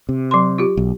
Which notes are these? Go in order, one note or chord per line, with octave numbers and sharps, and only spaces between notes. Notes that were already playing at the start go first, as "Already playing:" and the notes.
C3
F#3 C6
F4 G4
B1